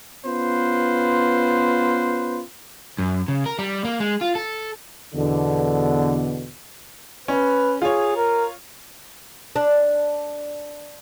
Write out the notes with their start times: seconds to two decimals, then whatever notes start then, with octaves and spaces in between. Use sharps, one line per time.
0.25 B3 C#4 F4 B4 C5
2.99 F#2
3.28 C#3
3.46 A#4
3.59 G3
3.85 A#3
4.00 G#3
4.21 F4
4.35 A4
5.14 E2 B2 D3
7.28 C#4 B4
7.82 F4 G#4 C#5
8.17 A#4
9.56 D4